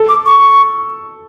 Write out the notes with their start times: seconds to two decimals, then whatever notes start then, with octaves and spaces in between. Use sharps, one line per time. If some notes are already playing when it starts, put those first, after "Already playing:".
Already playing: A4
0.09 D6
0.26 C#6